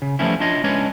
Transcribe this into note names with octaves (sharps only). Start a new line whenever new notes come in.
C#3
F3 G3 A3 B3 C#4 E4
D4 E4 F4 C#5 D#5
G#3 C#4 D4 E4 B4 C#5